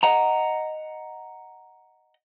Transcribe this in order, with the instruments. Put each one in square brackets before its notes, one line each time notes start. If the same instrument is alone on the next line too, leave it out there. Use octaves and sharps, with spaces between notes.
[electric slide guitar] D#5 F#5 A#5